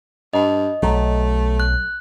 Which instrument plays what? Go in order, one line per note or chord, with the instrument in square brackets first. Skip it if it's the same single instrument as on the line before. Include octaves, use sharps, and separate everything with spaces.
[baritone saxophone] G2 [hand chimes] D#5
[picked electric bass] B1 F#3 [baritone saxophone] A3
[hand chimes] F#6